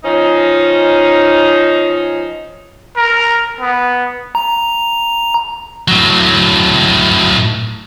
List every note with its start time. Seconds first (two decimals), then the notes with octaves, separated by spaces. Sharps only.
0.04 F3 C#4 D#4
2.97 A#4
3.60 B3
4.35 A#5
5.88 A2 F#3